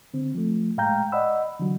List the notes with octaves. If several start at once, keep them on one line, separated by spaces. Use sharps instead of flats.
D3 C4
F3 A3
A2 G#3 F5 G5 A#5 G6
D5 D#5 F#5 B5 E6
D3 E3 F#3